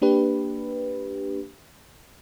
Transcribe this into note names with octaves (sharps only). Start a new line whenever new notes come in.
A#3 D4 G4 B4